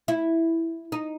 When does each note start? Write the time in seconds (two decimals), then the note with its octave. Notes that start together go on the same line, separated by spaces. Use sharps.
0.08 E4
0.92 D#4